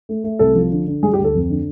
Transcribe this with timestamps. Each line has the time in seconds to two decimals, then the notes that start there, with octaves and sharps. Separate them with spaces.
0.09 A3
0.24 A3
0.39 C2 A4
0.55 F3
0.72 D3
0.87 D3
1.03 G3 G#4
1.14 G4
1.18 D2
1.24 A4
1.35 F2
1.50 D3